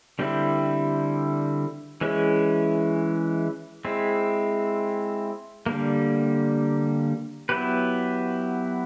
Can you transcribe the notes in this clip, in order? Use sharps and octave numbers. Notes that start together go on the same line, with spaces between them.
D3 G3 C4 E4
E3 G#3 C#4 E4
G#3 C4 E4
D3 G3 A#3
F#3 B3 E4 G4 B4